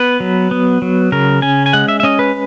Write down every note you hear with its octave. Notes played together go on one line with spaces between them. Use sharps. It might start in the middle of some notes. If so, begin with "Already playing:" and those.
Already playing: B3 B4
F#3
B3
F#3
C#3 A#4
C#4 G#5
G#5
G#3 F#5
E5
E5
C#4 D#5
B4